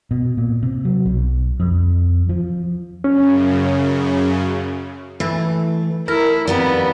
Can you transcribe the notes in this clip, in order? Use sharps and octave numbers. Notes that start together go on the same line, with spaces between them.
B2
A#2
C3
F#3
B1
F2
F3
F#2 C#3 C#4
E3 A3
E4 A4 A#4
F2 D#3 G3 B3